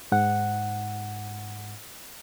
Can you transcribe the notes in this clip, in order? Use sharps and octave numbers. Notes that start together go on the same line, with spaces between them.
G#2 F#5